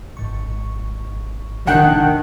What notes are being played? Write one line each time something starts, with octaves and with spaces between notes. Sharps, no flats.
G#1 G#2 C#6
D#3 D4 F#5 G5 F#6